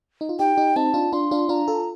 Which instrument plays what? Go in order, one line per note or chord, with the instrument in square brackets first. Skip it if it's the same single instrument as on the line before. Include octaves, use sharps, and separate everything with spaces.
[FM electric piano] D#4
F4
[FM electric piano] D#4 G4 [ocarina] G5
[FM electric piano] D#4 G4
[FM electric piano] C4 D#4 [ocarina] A5
[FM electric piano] D4 F4
[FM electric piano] D4 F4 [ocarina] C6
[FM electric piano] D4 F4
[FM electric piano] D4 F4 [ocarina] A#5
[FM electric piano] F4 A4